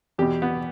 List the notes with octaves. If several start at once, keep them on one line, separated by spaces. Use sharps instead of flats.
E2 B2 G4
B3